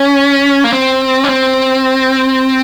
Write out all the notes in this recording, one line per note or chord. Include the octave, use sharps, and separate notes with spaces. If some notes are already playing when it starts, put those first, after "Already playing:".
Already playing: C#4
A#3
C4
C#4
C4